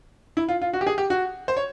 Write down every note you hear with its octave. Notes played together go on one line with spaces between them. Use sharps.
E4
F4
F4
F#4
G4
G#4
G4
F#4
C5
C#5